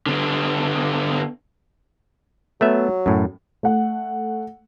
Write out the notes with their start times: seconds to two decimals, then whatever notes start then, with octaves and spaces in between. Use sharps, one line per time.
0.06 D3 B3
2.61 F#3 A3 B3 E5
3.06 F#2 A2
3.63 A3 F#5